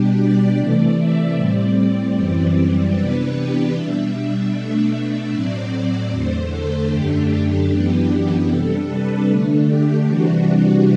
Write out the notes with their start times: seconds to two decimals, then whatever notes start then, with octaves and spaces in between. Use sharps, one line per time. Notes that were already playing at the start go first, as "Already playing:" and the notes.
Already playing: B2 G3 D4 G4
0.18 D5
0.57 C3 E3 A3 D5
0.97 E5
1.36 A2 G3 C4 D5
2.15 F#2 E3 G3 C4
2.95 C3 E3 B3 D4 B4
3.34 G4
3.73 B2 G3 D4 E5
4.52 B2 A3 D4
5.31 A2 F#3 C4 D5
6.10 E2 D3 A3 C5
6.51 A4
6.90 F#2 D3 A3 D4 G4
7.69 F#2 E3 B3 D4
8.48 C3 G3 D4 A4
8.87 B4
9.27 D3 A3 D4
9.66 G4
10.06 C3 E3 G3 D4 F#4